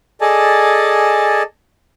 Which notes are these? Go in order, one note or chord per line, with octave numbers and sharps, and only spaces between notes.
G#4 A4 D5 D#5 G#5 A5